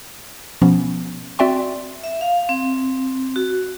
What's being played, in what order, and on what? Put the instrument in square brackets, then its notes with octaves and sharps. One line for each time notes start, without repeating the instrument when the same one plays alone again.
[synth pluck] B2 F3 B3 C#4
C4 F#4 D5 E5 G5 C6
[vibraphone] E5
F5
C4
F#4